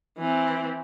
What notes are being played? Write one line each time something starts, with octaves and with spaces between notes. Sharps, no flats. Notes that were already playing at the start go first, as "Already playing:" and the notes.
E3 C4